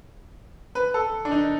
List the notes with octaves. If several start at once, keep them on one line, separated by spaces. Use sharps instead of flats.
B4
A4
D4
D#4